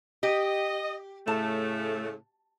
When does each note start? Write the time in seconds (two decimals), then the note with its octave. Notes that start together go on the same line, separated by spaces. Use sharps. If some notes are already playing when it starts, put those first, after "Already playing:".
0.23 G4 D#5
1.28 A2 C#3 A3 A5